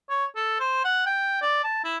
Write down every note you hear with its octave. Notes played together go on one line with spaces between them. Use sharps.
C#5
A4
C5
F#5
G5
D5
A5
E4